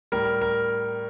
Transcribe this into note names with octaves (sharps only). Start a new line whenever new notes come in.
A2 G3 A#4
A#4